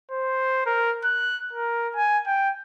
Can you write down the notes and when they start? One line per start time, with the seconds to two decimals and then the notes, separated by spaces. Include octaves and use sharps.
0.11 C5
0.66 A#4
1.04 F#6
1.53 A#4
1.96 G#5
2.27 G5